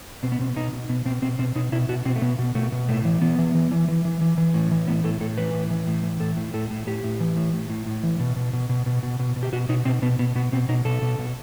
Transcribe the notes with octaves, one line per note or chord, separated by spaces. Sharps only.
B2 C4
B3
B2 C4
B2 D#4
B2
B2 B3
B2 C4
B2 C4
B2 C4
B2 D#4
B2 E4
B2 F#4
B2 C4
A3
B2 B3
B2
B2 A3
B2
A2 A3
E3
E3 B3
E3
E3
E3
E3
E3
E3
E3
A2
E3
A2 B3
A2 A4
A2 A4
E3 B4
A2
E3
A2
E3
A2 A4
A2
A2 A4
A2
A2 G4
A2
E3
A2
A2
A2
A2
E3
B2
B2
B2
B2
B2
B2
B2
B2
G4
B2 F#4
B2 D#4
B2 C4
B2 B3
B2 B3
B2 B3
B2 C4
B2 D#4
B2 A4
B2
B2